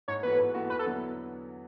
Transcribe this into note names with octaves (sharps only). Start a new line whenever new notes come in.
G#2 C#5
E3 B3 F#4 A4 B4
G#2
E3 B3 F#4 A4
E2 B4
A4
D3 F#3 B3 E4